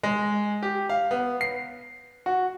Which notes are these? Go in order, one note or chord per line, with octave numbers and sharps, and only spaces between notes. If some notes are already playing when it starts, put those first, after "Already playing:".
G#3
G4
F5
B3
C7
F#4